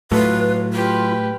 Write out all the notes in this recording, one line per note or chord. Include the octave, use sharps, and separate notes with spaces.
A2 F#3 A3 F4 B4
F4 G4 B4